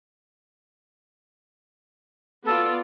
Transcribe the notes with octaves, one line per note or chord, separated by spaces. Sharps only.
B3 F4 A4 D5